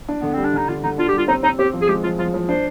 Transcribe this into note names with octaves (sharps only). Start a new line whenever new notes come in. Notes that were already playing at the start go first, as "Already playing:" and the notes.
D4
D3 B3
C4
G3
D4
D3 D#4
D3 F4
D3 D#4
D4 F4
G4
G3 F4
C4 D#4
C4 D#4
C4 G4
F3
G#4
G#3 G4
F3 F4
F3 F4
F3
D4 C5